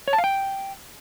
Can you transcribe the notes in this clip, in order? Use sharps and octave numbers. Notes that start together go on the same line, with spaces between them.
C#5
A5
F5
G5